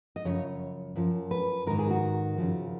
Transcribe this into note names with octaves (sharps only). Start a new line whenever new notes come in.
D#5
F#2 C#3 F3 C#5
F#2 F3
B4
G#2 D#3 A#4
G#4
F#4
F#2 C#3 F3